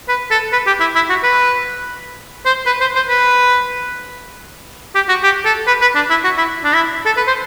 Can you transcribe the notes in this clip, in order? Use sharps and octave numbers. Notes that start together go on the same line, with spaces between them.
B4
A4
B4
G4
E4
E4
F#4
B4
C5
B4
C5
C5
B4
G4
F#4
G4
A4
B4
B4
D4
E4
F#4
E4
D4
E4
A4
B4
C5